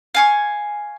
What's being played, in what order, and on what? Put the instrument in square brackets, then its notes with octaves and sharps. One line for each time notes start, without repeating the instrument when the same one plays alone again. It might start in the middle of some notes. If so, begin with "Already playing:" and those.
[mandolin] F5 G#5 C#6